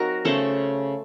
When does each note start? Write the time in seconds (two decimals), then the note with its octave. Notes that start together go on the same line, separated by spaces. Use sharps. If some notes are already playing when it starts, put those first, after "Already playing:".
Already playing: F#3 C4 D#4 F#4 A#4
0.25 C#3 A3 C#4 A4 C5